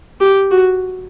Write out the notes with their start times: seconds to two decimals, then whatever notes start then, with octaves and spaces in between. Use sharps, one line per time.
0.20 G4
0.51 F#4